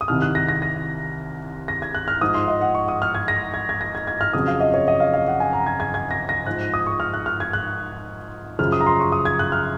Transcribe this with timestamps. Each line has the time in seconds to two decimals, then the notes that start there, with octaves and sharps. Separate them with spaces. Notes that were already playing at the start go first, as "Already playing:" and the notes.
0.01 D#6
0.08 C2 C3 D#3 F6
0.22 F#6
0.35 A#6
0.48 A#6
0.62 A#6
1.68 A#6
1.82 G#6
1.95 F#6
2.08 F6
2.21 G#2 F3 D#6
2.35 C6
2.48 D#5
2.61 F#5
2.75 C#6
2.88 D#6
3.02 F6
3.15 G#6
3.28 A#6
3.54 G#6
3.69 G#6
3.81 A#6
3.95 G#6
4.07 G#6
4.21 F6
4.33 F2 C#3 F#3 D#6
4.47 F5
4.60 D#5
4.74 C#5
4.88 D#5
5.00 F5
5.13 F5
5.28 F#5
5.40 G#5
5.53 A#5
5.66 G#6
5.80 G#6
5.94 G#6
6.11 A#6
6.29 A#6
6.46 G#2 F3 F#6
6.74 D#6
6.87 C#6
7.00 F6
7.14 F#6
7.26 F6
7.40 G#6
7.53 F#6
8.59 F#2 C#3 F3 F6
8.72 D#6
8.81 A#5
8.87 C6
9.00 C#6
9.12 D#6
9.25 G#6
9.39 F#6
9.52 F6